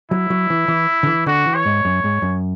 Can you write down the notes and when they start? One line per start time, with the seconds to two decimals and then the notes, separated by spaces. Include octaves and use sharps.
0.11 F#3 E4
0.30 F#3
0.50 E3
0.68 E3
1.03 D3
1.07 E3
1.26 D3 F#4
1.46 E3
1.55 C#5
1.65 G#2
1.85 F#2
2.04 G#2
2.22 F#2